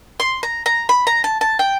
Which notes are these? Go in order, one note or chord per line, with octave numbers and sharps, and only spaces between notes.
C6
A#5
A#5
B5
A#5
A5
A5
G5